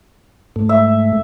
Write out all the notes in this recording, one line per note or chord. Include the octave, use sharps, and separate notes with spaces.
G#2 A3
E5